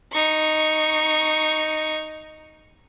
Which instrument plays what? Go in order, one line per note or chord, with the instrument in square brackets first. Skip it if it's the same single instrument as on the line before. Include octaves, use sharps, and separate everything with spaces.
[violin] D#4 C#6